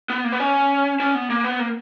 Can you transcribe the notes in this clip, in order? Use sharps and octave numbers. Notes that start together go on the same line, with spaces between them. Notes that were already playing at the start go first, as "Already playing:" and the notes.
B3
A#3
B3
C#4
C#4
B3
A#3
B3
A#3